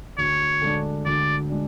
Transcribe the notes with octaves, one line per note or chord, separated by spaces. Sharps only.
D2 C#5
D3 G#3 D4
D2 D5
G#3 D4